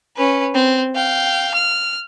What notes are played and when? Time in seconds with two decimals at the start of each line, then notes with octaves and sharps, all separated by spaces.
0.17 C#4 B4
0.55 C4
0.95 F5 G5
1.54 F6